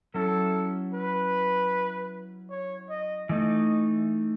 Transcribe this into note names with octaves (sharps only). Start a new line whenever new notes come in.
F#3 C#4 E4 A4
B4
C#5
D#5
E3 A3 D#4 D#5